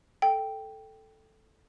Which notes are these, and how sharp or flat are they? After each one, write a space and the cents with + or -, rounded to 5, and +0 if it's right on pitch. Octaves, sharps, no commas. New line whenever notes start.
A4 +0 G5 +0